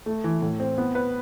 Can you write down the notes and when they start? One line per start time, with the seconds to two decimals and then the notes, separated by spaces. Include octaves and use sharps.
0.06 A3
0.24 E3
0.42 A2
0.60 C4
0.78 B3
0.95 B4